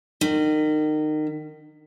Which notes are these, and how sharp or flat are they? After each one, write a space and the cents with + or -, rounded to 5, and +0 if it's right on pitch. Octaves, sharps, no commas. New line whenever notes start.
D#3 -25